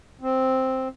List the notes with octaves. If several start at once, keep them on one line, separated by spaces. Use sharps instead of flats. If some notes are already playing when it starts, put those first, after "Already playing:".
C4